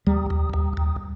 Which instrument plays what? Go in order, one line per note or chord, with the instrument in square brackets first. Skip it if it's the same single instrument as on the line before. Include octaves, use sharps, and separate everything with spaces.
[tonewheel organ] D#2 [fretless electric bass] G3
[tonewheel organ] D#2
D#2
D#2